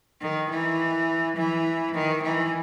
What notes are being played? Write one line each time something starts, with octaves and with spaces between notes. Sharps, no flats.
D#3
E3
E3
D#3
E3